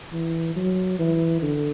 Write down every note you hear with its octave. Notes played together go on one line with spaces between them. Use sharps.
E3
F#3
E3
D3